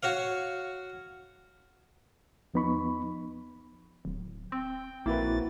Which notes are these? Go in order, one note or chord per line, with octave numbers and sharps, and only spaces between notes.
F#4 C#5 F5
E2 F3 B3 D#4 B5 C#6
D1
C4 G5
A#1 A#3 C4 E4 F#4 A#4 B4 A6